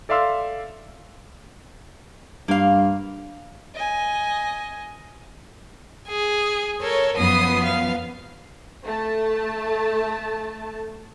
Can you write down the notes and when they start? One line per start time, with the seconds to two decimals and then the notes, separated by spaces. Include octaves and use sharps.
0.09 A4 D5 E5 F5 C6 E6
2.48 G2 A#3 F5
3.75 D#5 G#5
6.08 G#4
6.82 A4 A#4 C#5
7.17 F#2 F3 B3 D#6 C7
7.64 F5
8.85 A3 A5